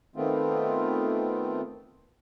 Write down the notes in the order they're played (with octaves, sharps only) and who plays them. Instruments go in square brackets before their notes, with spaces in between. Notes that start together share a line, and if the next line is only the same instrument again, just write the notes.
[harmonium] D#3 A3 B3 C4 F4